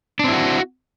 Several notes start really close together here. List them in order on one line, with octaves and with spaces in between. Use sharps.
D4 C4 E4 F#4